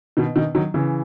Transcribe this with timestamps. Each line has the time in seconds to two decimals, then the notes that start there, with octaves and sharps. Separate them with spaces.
0.17 B2 D#3
0.35 B2 D#3
0.55 D#3 F#3
0.74 C#3 E3